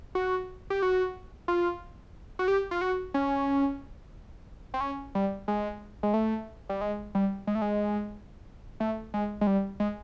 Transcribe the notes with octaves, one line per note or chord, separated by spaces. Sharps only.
F#4
G4
F#4
F4
F#4
G4
F4
F#4
C#4
C4
C#4
G3
G#3
G#3
A3
G3
G#3
G3
G#3
A3
G#3
A3
G#3
G#3
G3
G#3